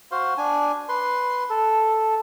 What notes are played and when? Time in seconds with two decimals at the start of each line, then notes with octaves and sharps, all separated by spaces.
0.11 F#4 C5 F5 C6
0.37 D4 G#5
0.89 B4 C6
1.50 A4